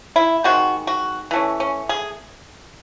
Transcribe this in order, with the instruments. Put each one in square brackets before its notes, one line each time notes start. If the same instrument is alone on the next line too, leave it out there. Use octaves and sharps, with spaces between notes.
[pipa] E4
D#3 G#3 C4 F#4
F#4
E3 A3 C#4
C#4
G#4